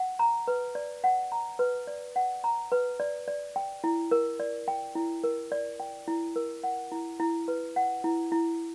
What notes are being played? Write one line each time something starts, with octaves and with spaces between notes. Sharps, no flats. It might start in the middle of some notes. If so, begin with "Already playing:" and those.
Already playing: F#5
A#5
B4
D5
F#5
A#5
B4
D5
F#5
A#5
B4
D5
D5
G5
E4
A#4
D5
G5
E4
A#4
D5
G5
E4
A#4
F#5
E4
E4
B4
F#5
E4
E4